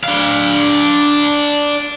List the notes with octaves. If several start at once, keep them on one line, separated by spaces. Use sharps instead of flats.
D4 F5